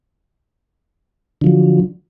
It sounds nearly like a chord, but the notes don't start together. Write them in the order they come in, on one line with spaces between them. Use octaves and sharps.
D3 F3 F#3